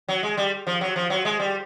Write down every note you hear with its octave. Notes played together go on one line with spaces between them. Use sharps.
F#3
G#3
G3
F3
F#3
F3
F#3
G#3
G3